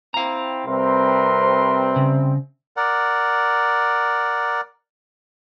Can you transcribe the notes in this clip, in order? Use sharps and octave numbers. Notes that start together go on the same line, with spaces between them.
C4 E4 F5 G5 A#5
C3 G3 C4 A#4 B4 C6
C#3
A#4 D5 F#5